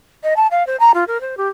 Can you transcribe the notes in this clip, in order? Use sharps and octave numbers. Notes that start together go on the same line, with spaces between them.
D#5
A5
F5
C5
A#5
F4
A#4
C5
G4